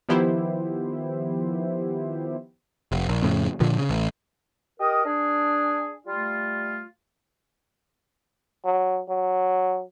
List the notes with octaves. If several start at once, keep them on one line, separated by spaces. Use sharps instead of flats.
D#3 F3 B3 E4 G4 C5
F1
A#1
F2 A2 C#3
A#2 D3 F3
C#3
A1
G4 A#4 D#5
D4 G#4
G3 A3 F4
F#3
F#3